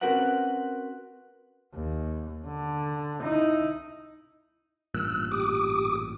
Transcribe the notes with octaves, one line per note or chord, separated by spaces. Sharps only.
C4 C#4 F#4 A#4 B4 F#5
D#2
D3
D#4 E4
A1 G2 A#2 E6 F#6
G4 D6 D#6